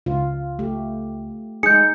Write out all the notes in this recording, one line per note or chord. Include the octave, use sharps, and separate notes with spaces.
C#2 F4
A3 G4
G#3 D#4 G#4 G6 C#7